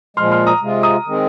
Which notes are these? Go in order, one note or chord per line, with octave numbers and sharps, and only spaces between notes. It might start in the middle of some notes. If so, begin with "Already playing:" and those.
A#2 F3 G#3 C6 F6
C6 F6
A#5 D#6
C3 G#3 F4
A#5 D#6
D#3 G#3 C4